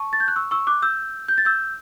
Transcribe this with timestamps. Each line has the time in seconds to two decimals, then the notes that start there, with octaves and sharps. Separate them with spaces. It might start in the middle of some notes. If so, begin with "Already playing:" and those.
Already playing: A5 C#6
0.13 A6
0.20 G6
0.28 F#6
0.36 C#6 E6
0.51 C#6 E6
0.67 D6 F#6
0.82 E6 G6
1.28 G6
1.38 A6
1.45 E6 G6